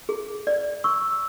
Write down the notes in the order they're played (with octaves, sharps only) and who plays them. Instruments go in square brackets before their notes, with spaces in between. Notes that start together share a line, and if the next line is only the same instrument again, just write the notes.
[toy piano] G#4
D5
[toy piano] C#6 [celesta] E6